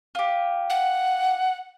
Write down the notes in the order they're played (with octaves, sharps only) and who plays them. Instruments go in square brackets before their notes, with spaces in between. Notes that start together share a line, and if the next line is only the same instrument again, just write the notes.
[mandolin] F4 G4
[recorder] F#5